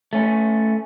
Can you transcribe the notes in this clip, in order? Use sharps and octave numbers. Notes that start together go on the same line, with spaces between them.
A3 C#4